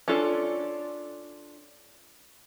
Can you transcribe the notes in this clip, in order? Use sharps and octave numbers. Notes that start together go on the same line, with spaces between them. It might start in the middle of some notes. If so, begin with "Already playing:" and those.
C#4 D4 F4 A4